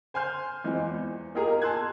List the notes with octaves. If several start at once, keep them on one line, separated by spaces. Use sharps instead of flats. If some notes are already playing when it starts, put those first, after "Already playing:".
C5 G#5 C6 F6 G6
E3 G#3 C4 F4
E2
A#3 D#4 F4 G4 G#4 A#4
G#5 A5 C6 E6 F#6 G#6